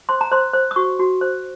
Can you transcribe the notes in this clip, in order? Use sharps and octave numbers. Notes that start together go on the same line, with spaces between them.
C5 C6
A#5
C5 C6
C5
D#6
F#4 C#6
F#4
C5